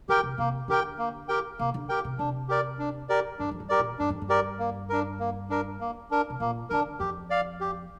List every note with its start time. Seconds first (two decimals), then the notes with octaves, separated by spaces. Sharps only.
0.08 D3 G4 A#4 G5
0.23 C3
0.38 C3 A#3
0.68 D3 G4 A#4 G5
0.98 A#3
1.28 G4 A#4 G5
1.59 C3 A#3
1.74 D3
1.89 G4 A#4 G5
2.05 C3
2.19 C3 D4
2.48 G4 A#4 D5
2.79 D4
3.09 G4 A#4 D5
3.39 G2 D4
3.51 F2
3.60 G2
3.69 G4 A#4 D5
3.79 A#2
3.99 G2 D4
4.10 F2
4.22 G2
4.29 G4 A#4 D5
4.59 A#3
4.89 D4 A#4
5.20 A#3
5.50 D4 A#4
5.81 A#3
6.11 D4 A#4
6.30 C3
6.40 A#2 A#3
6.70 D3 D4 A#4
7.00 F2 G4
7.30 D5 F5
7.61 G4